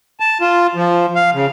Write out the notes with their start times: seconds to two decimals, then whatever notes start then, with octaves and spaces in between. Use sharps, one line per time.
0.20 A5
0.41 F4
0.75 F3
1.15 F5
1.34 C#3